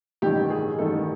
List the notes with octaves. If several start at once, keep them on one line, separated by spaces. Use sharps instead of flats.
A1 G2 D#3 G4
G#4
A1 G2 D#3 A4